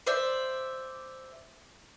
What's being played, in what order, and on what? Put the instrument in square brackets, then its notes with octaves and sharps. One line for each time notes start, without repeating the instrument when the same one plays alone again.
[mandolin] C5 D5 E5